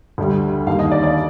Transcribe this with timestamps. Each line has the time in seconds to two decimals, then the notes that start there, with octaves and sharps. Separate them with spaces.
0.18 D2 D3 G3
0.67 D#2 D#3 G3 F5
0.79 D#5
0.92 D5
1.04 D5